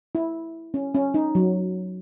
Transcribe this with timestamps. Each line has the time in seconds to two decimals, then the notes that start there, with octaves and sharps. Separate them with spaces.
0.15 E4
0.74 C#4
0.95 C#4
1.14 D#4
1.35 F#3